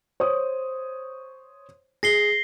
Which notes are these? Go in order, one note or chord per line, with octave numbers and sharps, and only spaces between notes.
C5 C#5 D#6
G#4 A#6 C7 G7